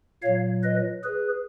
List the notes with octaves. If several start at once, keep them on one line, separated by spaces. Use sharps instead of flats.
A#2 F#3 C#5 F5
B4 D#5
G#4 B4